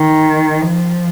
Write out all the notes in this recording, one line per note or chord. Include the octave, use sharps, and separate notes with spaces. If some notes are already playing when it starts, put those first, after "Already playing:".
Already playing: D#3
F3